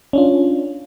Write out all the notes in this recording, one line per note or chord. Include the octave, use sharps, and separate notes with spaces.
C#4 D4 F4